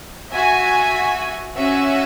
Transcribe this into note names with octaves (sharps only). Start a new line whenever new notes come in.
F#4 E5 G#5
C#4 F#4 E5 G#5